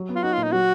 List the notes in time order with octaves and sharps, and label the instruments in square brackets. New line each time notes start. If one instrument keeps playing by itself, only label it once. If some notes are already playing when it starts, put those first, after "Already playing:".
Already playing: [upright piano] F#3
B3
[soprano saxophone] F4
[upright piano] D#4 [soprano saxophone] F#4
[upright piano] A#2 [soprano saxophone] F4
[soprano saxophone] D#4
[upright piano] F#3 [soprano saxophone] F#4